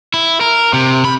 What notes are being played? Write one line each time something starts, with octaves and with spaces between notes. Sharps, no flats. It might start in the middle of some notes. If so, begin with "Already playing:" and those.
E4
A#4
C3
B5